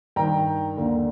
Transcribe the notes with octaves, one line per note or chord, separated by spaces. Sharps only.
G2 D#3 G5 A#5
D#2 D3